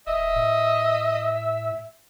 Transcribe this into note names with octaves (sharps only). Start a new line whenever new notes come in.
D#1 D#5 E5
A2